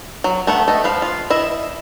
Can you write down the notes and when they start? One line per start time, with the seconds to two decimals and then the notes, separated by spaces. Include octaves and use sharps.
0.24 F#3
0.47 A3 B3 F#5
0.68 A3 D#5
0.84 F3 B4 F5
1.02 F4
1.30 E4 D#5 E5